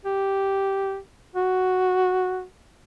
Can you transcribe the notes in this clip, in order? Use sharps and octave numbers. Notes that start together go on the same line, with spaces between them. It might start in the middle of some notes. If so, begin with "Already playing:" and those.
G4
F#4